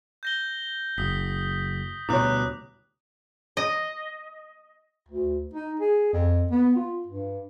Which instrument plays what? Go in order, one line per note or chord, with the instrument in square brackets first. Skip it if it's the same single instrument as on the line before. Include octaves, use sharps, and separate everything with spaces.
[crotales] G6 A#6 G7
[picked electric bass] F#1 [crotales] D#6 B6
[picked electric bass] D2 B2 G3 [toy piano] E4 C#5 [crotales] D6 D#6 F#6
[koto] D#5
[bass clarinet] D2
D#4
G#4
F2
B3
F4
G2